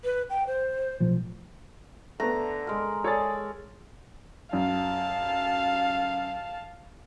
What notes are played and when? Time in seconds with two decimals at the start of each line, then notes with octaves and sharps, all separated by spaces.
0.04 B4
0.30 G5
0.47 C5
1.00 B1 A2 F3
2.20 D3 A3 B3 A#5
2.67 G#3 A#4
3.04 G#4 A4 C#5 D5 A6
4.53 F#2 F5 A5